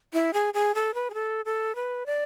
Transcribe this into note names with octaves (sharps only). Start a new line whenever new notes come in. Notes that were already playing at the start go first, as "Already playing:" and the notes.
E4
G#4
G#4
A4
B4
G#4
A4
A4
B4
D5